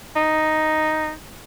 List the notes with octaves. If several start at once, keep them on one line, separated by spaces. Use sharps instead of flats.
D#4